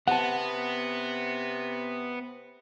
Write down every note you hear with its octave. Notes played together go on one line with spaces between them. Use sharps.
C3 B3 F#5 A5